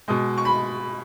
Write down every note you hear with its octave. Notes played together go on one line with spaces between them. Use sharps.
B2 G#3 D#6
C#6
B5